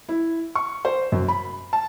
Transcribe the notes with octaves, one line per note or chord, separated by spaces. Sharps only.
E4
C#6
C5
F#2
B5
A5